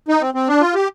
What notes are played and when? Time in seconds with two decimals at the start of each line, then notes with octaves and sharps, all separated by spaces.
0.08 D#4
0.21 C4
0.34 C4
0.48 D4
0.61 F4
0.75 G4